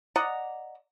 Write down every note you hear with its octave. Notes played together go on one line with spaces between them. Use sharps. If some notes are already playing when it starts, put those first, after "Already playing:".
D5 D#5 F#5 A#5